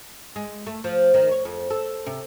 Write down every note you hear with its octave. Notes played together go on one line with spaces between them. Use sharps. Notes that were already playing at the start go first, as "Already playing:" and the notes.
G#3
A3
F3
D#3
C#5
F2
A4
C3